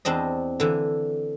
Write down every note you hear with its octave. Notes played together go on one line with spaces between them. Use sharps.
E2 C4 D4 D#5
D3 E3